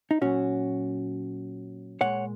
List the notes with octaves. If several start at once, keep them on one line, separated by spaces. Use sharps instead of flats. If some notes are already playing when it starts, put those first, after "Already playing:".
D#4
A#2 F#3 C#4 F#4
A#2 G#3 C#5 F#5